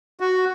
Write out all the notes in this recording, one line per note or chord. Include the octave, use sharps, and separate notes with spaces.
F#4